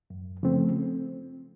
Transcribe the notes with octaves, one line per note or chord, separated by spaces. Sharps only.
F#2
C#3 F3 A3 C4